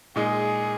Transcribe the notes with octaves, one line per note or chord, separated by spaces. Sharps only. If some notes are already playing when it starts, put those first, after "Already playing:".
A#2 G#3 D#4 G#4